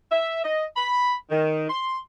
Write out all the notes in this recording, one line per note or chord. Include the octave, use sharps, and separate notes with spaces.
E5
D#5
B5
D#3
C6